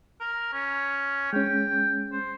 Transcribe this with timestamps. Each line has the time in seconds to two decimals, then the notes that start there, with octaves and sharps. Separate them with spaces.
0.20 A#4
0.53 C#4
1.33 G#3 C#4 G5
2.12 C5